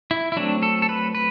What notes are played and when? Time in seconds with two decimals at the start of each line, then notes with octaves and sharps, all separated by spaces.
0.11 E4
0.32 E4
0.36 F#3 A3 C4 D4
0.63 A4
0.82 A4
0.89 B4
1.15 B4